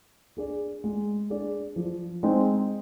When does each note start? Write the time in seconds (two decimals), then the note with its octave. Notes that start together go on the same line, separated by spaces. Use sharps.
0.37 D4 G#4 D5
0.84 G#3
1.30 D4 G#4 D5
1.76 F3
2.23 G#3 C4 D#4